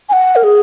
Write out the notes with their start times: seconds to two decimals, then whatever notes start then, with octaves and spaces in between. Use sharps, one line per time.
0.09 G#5
0.13 F#5
0.36 A#4
0.44 G#4